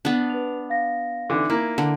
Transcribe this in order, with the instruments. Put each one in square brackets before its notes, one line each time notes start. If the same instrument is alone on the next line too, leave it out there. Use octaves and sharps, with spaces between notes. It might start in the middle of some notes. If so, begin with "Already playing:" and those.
[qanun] B3 D4
[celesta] B4 F7
F5 A#6
[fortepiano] D3 E3 [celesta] D#4
[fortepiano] A#3 [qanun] E4
[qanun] D3